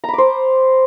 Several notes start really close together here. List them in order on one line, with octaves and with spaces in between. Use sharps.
A#5 B5 D6 C5